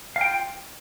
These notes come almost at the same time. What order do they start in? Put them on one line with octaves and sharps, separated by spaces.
F5 G5 F4